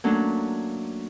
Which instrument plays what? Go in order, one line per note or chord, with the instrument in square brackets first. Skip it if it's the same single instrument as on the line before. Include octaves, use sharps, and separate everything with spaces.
[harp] F#3 A3 A#3 C#4 D4